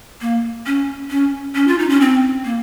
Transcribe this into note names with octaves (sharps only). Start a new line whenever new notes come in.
A#3
C#4
C#4
C#4
F4
D#4
C#4
C4
A#3